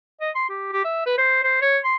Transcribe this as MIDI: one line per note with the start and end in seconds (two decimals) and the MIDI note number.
0.21 0.30 75
0.35 0.46 84
0.49 0.70 67
0.72 0.83 67
0.84 1.05 76
1.06 1.15 71
1.18 1.43 72
1.43 1.59 72
1.62 1.78 73
1.84 1.96 84